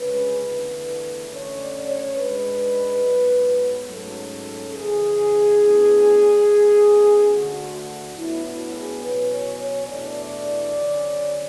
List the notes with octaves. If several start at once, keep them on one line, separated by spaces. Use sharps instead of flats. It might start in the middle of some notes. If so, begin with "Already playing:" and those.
Already playing: D2 C#3 G#3 C#4 B4
E2 D3 A3
F#2 D3 A3 C#4 C#5
D5
C#5
G#2 G#3 D4 B4
G#2 F#3 B3
G#2 F#3 A3 C#4 A4
F#2 C#3 E3 G#4
A2 E3 B3 D4
B2 A3 C#4
D2 D3 A3 D4 F#4
F#4
A2 F#3 B3 D4 E4
F#4
G#4
E2 B2 F#3 C#4 B4
C#5
C#5
E2 B2 A3 D4 D5
D2 D3 F#3 C#4